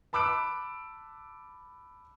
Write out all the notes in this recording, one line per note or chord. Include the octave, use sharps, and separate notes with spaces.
A5 B5 D6 E6 F#6 D7